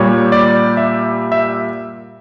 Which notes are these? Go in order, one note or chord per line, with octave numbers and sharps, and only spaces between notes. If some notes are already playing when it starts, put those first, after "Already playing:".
Already playing: A#2 G3 C#5
D5
E5
E5